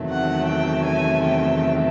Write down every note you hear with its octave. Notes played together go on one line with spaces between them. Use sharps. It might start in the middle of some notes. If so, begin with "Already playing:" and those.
Already playing: E2 C3 D#3 F#3 A3
F#5
G5
G#5
G5